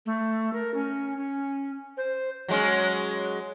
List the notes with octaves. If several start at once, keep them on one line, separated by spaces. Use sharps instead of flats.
A3
A#4
C#4
C#4
C5
F#3 G#3 C#4